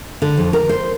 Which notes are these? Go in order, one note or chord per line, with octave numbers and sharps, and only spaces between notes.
D3
F2
A#4
C5